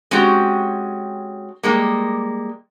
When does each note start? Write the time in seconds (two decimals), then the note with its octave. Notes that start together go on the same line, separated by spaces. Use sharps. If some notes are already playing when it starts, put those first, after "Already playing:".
0.11 G#3 C4 C#4 F#4 G4
1.63 G3 G#3 A#3